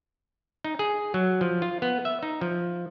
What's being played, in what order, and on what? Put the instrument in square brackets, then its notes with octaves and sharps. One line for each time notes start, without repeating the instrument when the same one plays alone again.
[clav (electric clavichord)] D#4
G#4
F#3
F3
F4
B3
E5
D#4
F3